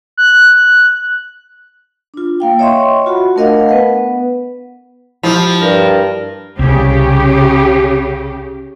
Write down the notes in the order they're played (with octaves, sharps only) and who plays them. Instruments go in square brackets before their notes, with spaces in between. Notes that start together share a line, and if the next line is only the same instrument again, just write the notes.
[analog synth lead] F#6
[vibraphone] D4 F4
A#3 F5 G5
C#5 D#5 E5 G5 C6 C#6
F4 F#4 F#5 B5
A3 D4 A#4 D#5 F5 F#5
B3 B4 F#5
[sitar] F3 [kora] E4 G4
[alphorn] G2 [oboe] A#4
[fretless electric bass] C2 [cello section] C#3 G4